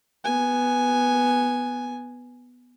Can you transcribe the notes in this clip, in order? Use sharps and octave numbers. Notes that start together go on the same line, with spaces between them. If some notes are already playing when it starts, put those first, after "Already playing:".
B3 G#5